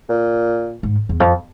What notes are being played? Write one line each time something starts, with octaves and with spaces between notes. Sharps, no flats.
A#2
G#2
E2
F2